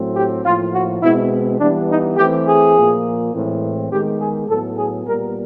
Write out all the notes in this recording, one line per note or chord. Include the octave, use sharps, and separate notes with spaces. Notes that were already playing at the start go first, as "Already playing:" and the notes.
Already playing: A2 F#3 A3 C4
G4
A2 F3 A#3 F4
F#4
B2 G#3 C4 E4
E3 G3 B3 D4
D#4
E3 A3 C4 G4
G#4
A#2 F3 A#3
A2 E3 G#3 C4
D#3 G#3 B3 G4
G#4
A2 F#3 B3 A4
G#4
A#2 G3 B3 A#4